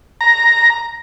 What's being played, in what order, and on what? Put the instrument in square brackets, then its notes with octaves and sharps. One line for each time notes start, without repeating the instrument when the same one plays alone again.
[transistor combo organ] A#5